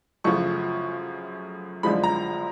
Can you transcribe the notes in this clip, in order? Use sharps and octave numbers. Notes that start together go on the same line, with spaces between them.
F#2 C#3 F3 A3 C#6
F#2 D3 F3 G#3 B5
A#5